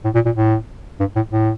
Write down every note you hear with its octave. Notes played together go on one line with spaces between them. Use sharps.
A2
A#2
A#2
A2
G2
A2
A2